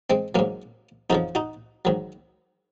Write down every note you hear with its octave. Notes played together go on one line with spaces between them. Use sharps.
G#3 C4
G#2 F#3 A#3 C#4
F2 C#3 F3 D#4 F#4
D#4 F#4
G#2 D#3 F#3